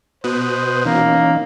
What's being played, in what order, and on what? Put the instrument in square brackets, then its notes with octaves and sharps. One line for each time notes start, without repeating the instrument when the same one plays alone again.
[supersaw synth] B2 [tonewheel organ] B4 D#6 F#6 [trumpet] C5
[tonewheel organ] E3 C#4 D#4 [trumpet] A#3